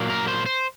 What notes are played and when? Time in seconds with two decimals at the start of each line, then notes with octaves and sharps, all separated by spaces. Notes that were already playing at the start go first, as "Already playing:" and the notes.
Already playing: A#2 F#3 A#3
0.10 A#4
0.28 C5
0.46 C5